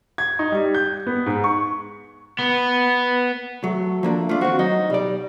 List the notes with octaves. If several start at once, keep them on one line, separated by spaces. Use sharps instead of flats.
G#6
D#4
G3
G6
B3
G#2
C#6
B3
F#3 A3
F3 A#3 D4
A3 D4 F4
D#3 C4 F#4
F#3 D#4
B1 G3 D5